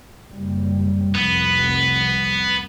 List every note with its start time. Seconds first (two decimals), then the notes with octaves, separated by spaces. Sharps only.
0.29 F#1 G3
1.16 F1 C2 B3